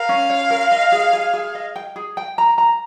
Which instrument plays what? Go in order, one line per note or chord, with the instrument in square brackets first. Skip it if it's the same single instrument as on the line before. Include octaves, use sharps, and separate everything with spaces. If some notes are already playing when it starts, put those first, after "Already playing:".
Already playing: [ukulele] A#4 [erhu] F5
[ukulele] C#4
C#5
A#4
D#5
G#4
G#4
G#4
D#5
G5
G#4
G5
A#5
A#5